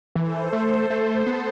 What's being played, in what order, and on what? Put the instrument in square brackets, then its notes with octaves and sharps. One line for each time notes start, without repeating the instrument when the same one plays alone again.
[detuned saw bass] E3 [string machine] A4 C5
[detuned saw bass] A3
A3
B3